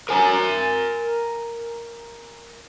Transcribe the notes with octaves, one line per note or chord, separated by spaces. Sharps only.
A#4 G#5 A#5